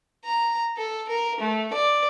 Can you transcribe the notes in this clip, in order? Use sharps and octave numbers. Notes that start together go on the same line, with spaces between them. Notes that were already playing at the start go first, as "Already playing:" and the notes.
A#5
A4
A#4
A3
D5